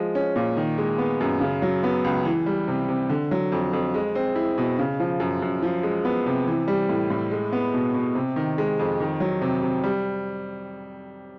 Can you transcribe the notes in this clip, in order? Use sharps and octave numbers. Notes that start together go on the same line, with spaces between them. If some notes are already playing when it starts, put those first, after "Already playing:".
Already playing: F3 G#3
C#4
A#2
D#3
G#3
B3
F#2
C#3
F#3
B3
C#2
E3
G3
C3
C3
D3
F#3
F2
F2
G#3
C4
E4
B2
C#3
F3
F#2
F#2
F3
G#3
B3
C3
E3
G3
A2
A2
G#3
B3
B2
B2
C3
D#3
G#3
F2
D#3
F#3
C3
C3
G3